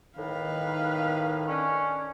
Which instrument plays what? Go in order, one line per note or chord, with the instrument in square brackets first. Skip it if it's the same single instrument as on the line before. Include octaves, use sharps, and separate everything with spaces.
[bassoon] A2 [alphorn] D#3 [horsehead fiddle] B4 F5
[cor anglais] C#4 [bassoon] D4